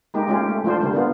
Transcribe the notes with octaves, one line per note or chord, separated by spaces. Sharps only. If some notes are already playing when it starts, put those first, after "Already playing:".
G#3 A#3 D#4 G4
G#3 A3 C#4 F4 G4
A3
F3 D4 F4 C5
D3 G3 A#3
A#3 B3 F4